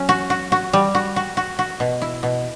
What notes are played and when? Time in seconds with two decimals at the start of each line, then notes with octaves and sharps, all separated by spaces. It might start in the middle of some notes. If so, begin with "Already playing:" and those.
Already playing: F#3 C#4
0.09 F#4
0.30 F#4
0.52 F#4
0.73 G3
0.95 F#4
1.16 F#4
1.37 F#4
1.59 F#4
1.80 B2
2.02 E4
2.23 B2